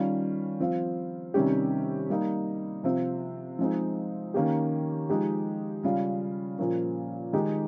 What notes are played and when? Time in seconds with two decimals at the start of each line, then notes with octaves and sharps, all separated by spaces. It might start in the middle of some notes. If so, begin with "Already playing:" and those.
Already playing: D#3 G3 C#4 F4
0.60 F3 C4 F4
1.34 C3 D#3 G3 C#4 G4
2.10 G3 A#3 D#4
2.84 C3 F3 C4 F4
3.59 F3 G#3 C4 D#4
4.34 D#3 A#3 C#4 G4
5.09 F3 G#3 D#4 G4
5.83 C#3 G3 C#4 F4
6.58 A#2 F3 A#3 C#4
7.33 D#3 G#3 D#4 G4